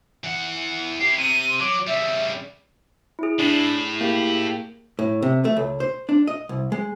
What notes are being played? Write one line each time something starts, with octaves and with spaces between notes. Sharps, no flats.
E3 F#5
E4 G4 C7
C3 D#7
F#3 D6
C#3 G3 E5
E4 G#4
A2 D4
A#3 G4
A2
C3
A3
C#2
C5
D4
D#5
C2
G#3